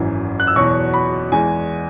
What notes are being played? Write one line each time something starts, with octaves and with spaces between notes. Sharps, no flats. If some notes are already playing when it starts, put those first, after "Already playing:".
Already playing: G#1 F#2 E3
F#6
E6
E2 B2 F#3 C#6
B5
E2 E3 G#3 G#5